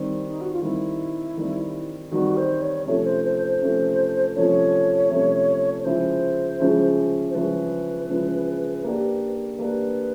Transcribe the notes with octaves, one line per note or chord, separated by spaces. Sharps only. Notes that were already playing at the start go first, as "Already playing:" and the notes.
Already playing: D#3 G3 C4
D#4
F#4
F4
D#3 G3 C4 E4
D#3 G3 C4
D#3 G3 C4 F#4
C5
C#5
C3 F3 A3 C#4 C#5
C5
C5
C5
C3 F3 A3 C#4
C3 F3 A3 C#4 C#5
C3 F3 A3 C#4
C#5
C#3 F3 G#3 C#4 E4 C5
C#3 F3 G#3 C#4 E4
C5
C#3 F3 G#3 C#4 E4 B4
C#3 F3 G#3 C#4 E4
A#3 D4 G4
A#3 D4 G4 B4